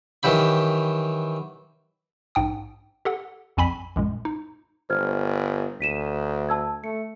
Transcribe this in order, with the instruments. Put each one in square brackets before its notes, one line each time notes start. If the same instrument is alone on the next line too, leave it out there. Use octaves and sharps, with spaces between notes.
[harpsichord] D#3 E3 F#3 G4 B5
[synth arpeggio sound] A#1 G#2 G5 D#6
G4 A4 F#5
A#1 F2 G#5 B5 B6
A#1 F#2 A#2 G#3
D#4
[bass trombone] G1 [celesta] C5 F6 G#6
[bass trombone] D2 [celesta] B6 D#7 E7
[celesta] A5 E6 G#6
[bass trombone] A3 [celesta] C#7